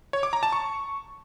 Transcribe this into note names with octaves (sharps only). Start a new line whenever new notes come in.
C#5
D6
A#5
A5
C#6